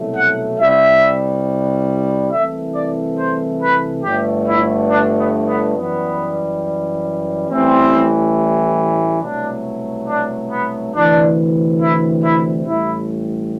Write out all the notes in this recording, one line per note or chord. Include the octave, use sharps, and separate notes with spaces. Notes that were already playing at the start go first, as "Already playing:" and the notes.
Already playing: C2 B2 F#3 A3
F#5
C2 C3 G3 E5
C2 C3 E3 A3 E5
D5
C5
B4
G1 G2 D3 A3 G4
E4
D4
B3
B3
F#2 E3 G3 B3
A1 A2 E3 G3 C4
C2 B2 F#3 A3 D4
D4
B3
D2 C3 E3 D4
E4
E4
A1 A2 G3 E4